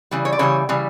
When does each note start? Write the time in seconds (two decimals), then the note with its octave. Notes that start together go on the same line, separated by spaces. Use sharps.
0.11 C#3 E3 G3
0.25 C#5
0.32 D5
0.39 C#3 E3 G3 C#5
0.69 C#3 E3 G3